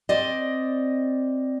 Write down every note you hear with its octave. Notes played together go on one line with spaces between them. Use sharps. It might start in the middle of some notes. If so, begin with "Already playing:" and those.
C4 D5 D#5